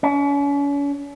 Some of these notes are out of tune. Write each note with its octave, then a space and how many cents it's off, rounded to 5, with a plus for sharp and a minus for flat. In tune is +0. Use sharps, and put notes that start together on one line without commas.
C#4 +40